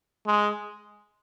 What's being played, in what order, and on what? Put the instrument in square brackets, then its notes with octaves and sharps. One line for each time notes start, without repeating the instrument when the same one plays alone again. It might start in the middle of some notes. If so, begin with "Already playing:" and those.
[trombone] G#3